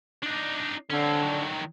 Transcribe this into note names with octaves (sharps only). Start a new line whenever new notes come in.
D4 D#4
D3 C4 C#4
D#3 F#3